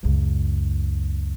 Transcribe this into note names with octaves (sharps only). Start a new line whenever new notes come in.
C#2 F#2